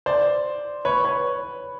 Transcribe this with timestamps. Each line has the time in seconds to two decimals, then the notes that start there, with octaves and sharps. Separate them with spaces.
0.06 C5 D5
0.85 B4 C#5
1.04 B4 C#5